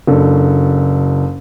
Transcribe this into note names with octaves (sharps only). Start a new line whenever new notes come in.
F#1 D4 A4